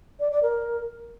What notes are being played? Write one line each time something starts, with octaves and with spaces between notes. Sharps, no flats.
D5
D5
A#4